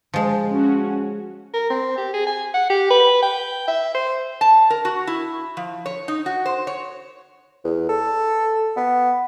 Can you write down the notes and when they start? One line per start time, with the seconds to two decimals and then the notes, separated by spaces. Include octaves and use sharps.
0.13 F3 G#3
0.50 C#4 F#4
1.54 A#4
1.70 C4
1.97 G4
2.14 G#4
2.27 G#5
2.54 F#5
2.70 G4
2.91 B4
3.23 G5
3.68 E5
3.95 C5
4.41 A5
4.70 A#4
4.85 F#4
5.07 E4
5.57 F3
5.86 C#5
6.08 D#4
6.26 F#4
6.46 C5
6.67 C#5
7.64 E2
7.89 A4
8.76 B3